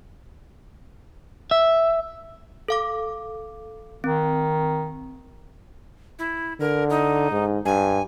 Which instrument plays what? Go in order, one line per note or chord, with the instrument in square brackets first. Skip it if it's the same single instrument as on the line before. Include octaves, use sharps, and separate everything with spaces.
[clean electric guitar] E5
[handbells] A4 F5 D6
[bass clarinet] D#3 [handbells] C4
[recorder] E4
[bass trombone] D3 [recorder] A#4
[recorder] D#4
[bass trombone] G#2
[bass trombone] G2 [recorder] G#5